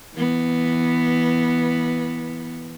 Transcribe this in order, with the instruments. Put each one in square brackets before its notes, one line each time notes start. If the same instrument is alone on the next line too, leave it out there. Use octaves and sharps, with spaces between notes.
[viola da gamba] E3 B3